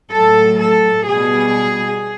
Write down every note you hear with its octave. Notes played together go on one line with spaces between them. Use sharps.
A2 F#3 A4
A4
B2 G3 G#4